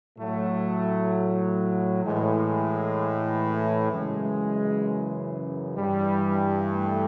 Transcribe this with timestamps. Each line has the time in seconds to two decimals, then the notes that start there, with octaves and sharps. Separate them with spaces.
0.18 A2 F#3 A3
2.04 A2 E3 G#3
3.91 F#2 C#3 E3 G#3
5.76 G2 E3 G3
6.70 A3